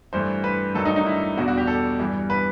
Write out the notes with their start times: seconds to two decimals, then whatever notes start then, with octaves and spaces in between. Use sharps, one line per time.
0.13 G2 E3 A3 C5
0.44 B4
0.74 G2 D#3 F#3 A3 A4
0.85 D#4
0.96 D#4
1.06 E4
1.37 E2 B2 G3 F#4
1.48 F#4
1.58 G4
1.67 A4
1.99 G2 E3 G3
2.30 B4